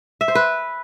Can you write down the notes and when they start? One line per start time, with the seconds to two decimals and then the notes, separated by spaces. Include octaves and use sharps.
0.21 E5
0.28 C5
0.35 B4